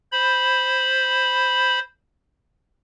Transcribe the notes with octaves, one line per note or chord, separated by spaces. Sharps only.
C5 B5